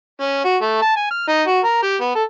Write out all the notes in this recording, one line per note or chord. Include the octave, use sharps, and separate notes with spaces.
C#4
F#4
A3
A5
G#5
F6
D#4
F#4
A#4
G4
B3
A4